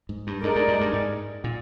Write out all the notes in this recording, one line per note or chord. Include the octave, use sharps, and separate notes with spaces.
G#2
G2
G2 G#3 D#4 A#4 D5
G2
G2
G2
G#2
A#2